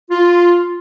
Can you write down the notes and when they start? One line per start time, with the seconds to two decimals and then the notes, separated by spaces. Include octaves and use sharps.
0.09 F4